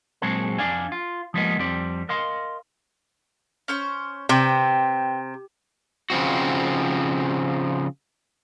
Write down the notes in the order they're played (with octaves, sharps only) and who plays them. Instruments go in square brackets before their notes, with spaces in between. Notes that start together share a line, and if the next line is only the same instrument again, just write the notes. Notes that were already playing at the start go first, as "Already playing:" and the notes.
[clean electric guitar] A#2 F#3 G#3 C4 G#4 A4
F2 D4 D5 F5 G#5
F4
F3 G3 G#3 A#3 B3 D#5
F2 G3 C4 D5
A#4 D#5 F5 C6
[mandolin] C#4 C5 C#6
[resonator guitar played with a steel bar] C3 [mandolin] B4 C5 G5
[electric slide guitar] C#3 F3 C4 F#4